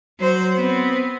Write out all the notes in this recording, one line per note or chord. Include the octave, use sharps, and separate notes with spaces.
F#3 C5
B3 C4